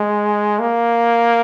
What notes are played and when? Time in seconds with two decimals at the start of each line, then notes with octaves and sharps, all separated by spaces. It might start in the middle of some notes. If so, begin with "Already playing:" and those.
Already playing: G#3
0.59 A#3